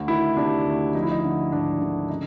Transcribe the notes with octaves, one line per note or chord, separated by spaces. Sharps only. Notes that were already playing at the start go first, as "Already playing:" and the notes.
Already playing: D2
D#3 E4
C3 D4
D2
F3 D#4
E4
D#4
D3
G#1 D4
D3
C#3 D#4